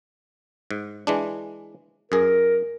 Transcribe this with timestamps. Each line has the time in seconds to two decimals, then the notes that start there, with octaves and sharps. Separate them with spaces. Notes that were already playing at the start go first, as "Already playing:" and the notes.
0.71 G#2
1.07 E3 G#3 D4
2.12 F#2 G#4 A#4